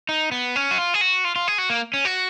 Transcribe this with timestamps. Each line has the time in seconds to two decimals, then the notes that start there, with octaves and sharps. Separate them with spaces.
0.09 D#4
0.32 B3
0.56 C#4
0.71 F#4
0.78 F4
0.94 G#4
1.01 F#4
1.25 F4
1.36 F4
1.48 G#4
1.58 F#4
1.70 A#3
1.94 C#4
2.05 F#4